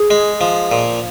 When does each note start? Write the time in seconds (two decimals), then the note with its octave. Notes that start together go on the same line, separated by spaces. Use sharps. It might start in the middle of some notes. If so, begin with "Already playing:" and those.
Already playing: G#4
0.11 G#3
0.41 F3
0.72 A#2